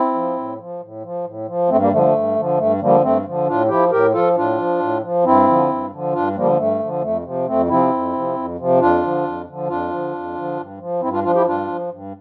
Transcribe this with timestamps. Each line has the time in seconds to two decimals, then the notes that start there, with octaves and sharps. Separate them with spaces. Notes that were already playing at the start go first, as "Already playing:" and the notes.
Already playing: C4 E4
0.14 F3
0.37 A2
0.59 F3
0.81 A2
1.03 F3
1.25 A2
1.47 F3
1.69 G2 A3 C4
1.81 G3 A#3
1.92 D3 F3 A3
1.98 G3
2.02 A3
2.13 G2
2.36 D3 F3
2.58 G2 A3
2.80 D3 F3 G3 A#3
3.02 G2 A3 C4
3.25 D3 F3
3.47 A2 D4 F4
3.69 F3 E4 G4
3.91 A2 G4 A#4
4.13 F3 F4 A4
4.36 A2 D4 F4
4.57 F3
4.80 A2
5.02 F3
5.24 G2 C4 E4
5.47 D3 F3
5.69 G2
5.91 D3 F3
6.13 G2 D4 F4
6.35 D3 F3 G3 A#3
6.52 A#3
6.58 G2 A3
6.80 D3 F3
7.02 F2 A3
7.24 C3 F3
7.46 F2 A3 C4
7.68 C3 F3 C4 E4
7.91 F2
8.13 C3 F3
8.35 F2
8.58 C3 F3
8.79 F2 D4 F4
9.02 D3 F3
9.23 F2
9.46 D3 F3
9.68 F2 D4 F4
9.91 D3 F3
10.13 F2
10.35 D3 F3
10.57 G2
10.79 F3
11.01 G2 C4 E4
11.12 D4 F4
11.24 F3 D4 F4
11.34 E4 G4
11.45 G2 D4 F4
11.68 F3
11.91 G2